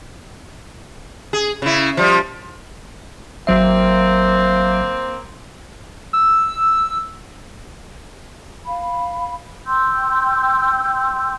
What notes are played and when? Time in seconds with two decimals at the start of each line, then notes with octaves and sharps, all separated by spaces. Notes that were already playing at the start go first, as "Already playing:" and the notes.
1.33 G#4
1.62 C#3 E4
1.97 F3 G3
3.47 G#1 F#3 A#3 C4 E5
6.13 E6
8.65 F5 B5
9.66 G5 C6 E6 G6